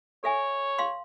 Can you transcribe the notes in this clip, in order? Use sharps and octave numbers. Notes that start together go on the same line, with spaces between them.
A4 C#5 E5 G#5
F5 C6